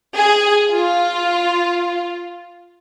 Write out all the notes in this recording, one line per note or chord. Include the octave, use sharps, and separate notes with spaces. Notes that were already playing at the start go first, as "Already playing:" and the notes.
G#4
F4